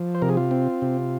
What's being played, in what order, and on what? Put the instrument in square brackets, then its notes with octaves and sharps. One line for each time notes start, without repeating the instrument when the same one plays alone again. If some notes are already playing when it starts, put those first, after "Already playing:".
Already playing: [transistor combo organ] F3
C5
C3 A#4
G#4
F4
C4
C3